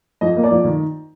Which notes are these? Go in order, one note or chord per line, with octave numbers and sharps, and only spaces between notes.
F2 D#5
A#3
D5
F2
D#3